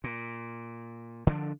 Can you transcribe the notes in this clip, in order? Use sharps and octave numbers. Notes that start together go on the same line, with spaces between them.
A#2
D3 F3 A#3 D4